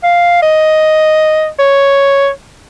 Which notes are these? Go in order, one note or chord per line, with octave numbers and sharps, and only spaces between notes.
F5
D#5
C#5